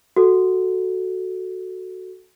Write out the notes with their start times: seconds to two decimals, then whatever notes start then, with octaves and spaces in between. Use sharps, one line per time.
0.16 F#4 A4